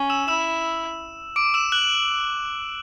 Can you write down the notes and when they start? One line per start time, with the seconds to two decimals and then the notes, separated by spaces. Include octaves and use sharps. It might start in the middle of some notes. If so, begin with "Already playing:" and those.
Already playing: C#4
0.10 E6 E7
0.28 E4 E6 E7
1.36 D6 D7
1.54 E6 E7
1.72 F#6 F#7